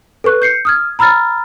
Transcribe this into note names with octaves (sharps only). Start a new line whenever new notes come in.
A4 B4 C#6 F#6
G6 C7 C#7
D#6 F6 G#6
A#5 B5 E6 F6 A6